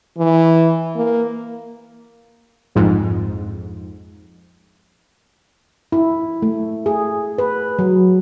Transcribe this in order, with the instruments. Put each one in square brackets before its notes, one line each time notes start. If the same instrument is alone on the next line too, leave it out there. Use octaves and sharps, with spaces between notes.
[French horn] E3
A#3
[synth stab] A#1 F2 G#2
[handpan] E4
A3
G#4
B4
F#3